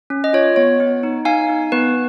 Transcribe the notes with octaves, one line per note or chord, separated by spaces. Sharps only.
C#4
D#5
F4 C#5
B3 C#5
B3
D#4
D#4 F5 G#5
D#4
B3 B4